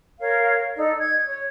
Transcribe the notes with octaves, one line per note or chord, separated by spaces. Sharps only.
A#4 C#5 F5
D#4 A4 D5
G#6
C#5